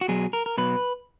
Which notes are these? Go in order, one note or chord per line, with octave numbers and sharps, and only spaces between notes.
F#4
B2 F#3 G#4
A#4
A#4
B2 F#3 B4